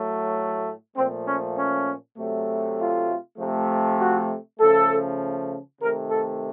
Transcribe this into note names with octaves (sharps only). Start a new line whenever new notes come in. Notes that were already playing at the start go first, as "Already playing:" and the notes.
Already playing: A2 F#3 A3
A#2 F3 A3 C4
C#4
C#4
C3 F#3 A3
F4
C3 F3 A3
F#4
C#3 F3 A3 A4
C3 D#3 A3 A#4
A4